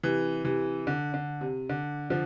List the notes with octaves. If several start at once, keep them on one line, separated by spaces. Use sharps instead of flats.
C3 E3
C3 E3
D3
D3
C3
D3
D3 F3